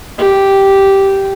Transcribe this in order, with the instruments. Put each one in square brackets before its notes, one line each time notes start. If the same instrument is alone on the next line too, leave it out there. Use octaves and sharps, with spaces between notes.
[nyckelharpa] G4